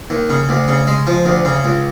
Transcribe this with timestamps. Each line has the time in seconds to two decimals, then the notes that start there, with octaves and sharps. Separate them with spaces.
0.10 D#2
0.30 C#3
0.49 D2
0.68 C#3
0.87 G#3
1.07 F3
1.25 D2
1.45 C#3
1.64 C#2